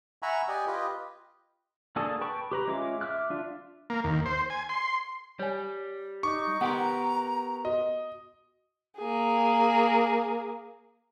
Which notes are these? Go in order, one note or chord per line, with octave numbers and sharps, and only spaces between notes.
E5 F#5 G#5 A#5 B5 C#6
G4 D5 D#5 G#5
F4 G4 B4 D#5
A#3 D4 F#4 G#4 A4
B4 G5 A5 C#6
G4 B4 A#5
G#3 C#4 F4 E5 D6
E5 D6 F6 F#6
D4 F4 E5
A#3
D#2
C5
G#5
C6
G3 C#5 G#5
D#4 C#6 D6
B3 G4 A#4 F#5 G5 A#5 C6
F#4 D#5
A#3 G#4